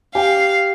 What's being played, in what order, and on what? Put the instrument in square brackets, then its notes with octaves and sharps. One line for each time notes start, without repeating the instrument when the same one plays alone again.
[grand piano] G4 [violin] F5